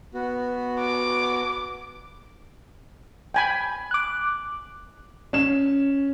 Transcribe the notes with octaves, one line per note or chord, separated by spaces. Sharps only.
B3 F#4
D6
G5 G#5 B5
D6 F#6
C#4 E7